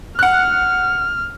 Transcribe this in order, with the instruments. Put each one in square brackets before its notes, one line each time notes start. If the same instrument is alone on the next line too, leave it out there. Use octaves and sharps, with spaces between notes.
[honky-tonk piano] F#5 F#6 [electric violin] F6